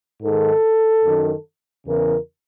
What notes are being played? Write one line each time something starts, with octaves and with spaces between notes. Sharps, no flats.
G#2 D#3 A4
F#2 D#3
E2 C#3 E3 A#4